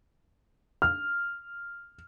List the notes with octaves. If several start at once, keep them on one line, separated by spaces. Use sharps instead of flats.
F6